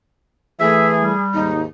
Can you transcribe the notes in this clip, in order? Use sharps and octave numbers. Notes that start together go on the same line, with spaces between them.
E3 A3 G#4 E5
G3
D#2 G#2 D#4